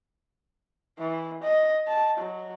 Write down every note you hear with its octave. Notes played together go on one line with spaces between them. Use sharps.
E3
D#5
A5
F#3